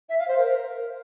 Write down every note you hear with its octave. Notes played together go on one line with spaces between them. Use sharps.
E5
F5
C5
A#4